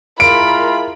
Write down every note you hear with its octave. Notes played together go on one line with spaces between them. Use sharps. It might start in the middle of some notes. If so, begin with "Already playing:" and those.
G#3 E4 F4 A#4 B5 D7